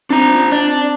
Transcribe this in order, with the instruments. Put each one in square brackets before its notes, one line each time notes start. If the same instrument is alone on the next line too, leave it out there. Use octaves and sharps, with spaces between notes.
[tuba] C4 [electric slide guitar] D4 A#5
[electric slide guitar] D4